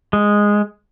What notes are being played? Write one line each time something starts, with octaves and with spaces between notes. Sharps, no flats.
G#3